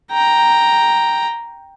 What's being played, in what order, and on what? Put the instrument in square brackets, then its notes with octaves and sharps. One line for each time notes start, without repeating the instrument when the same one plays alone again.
[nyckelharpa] G5 A#5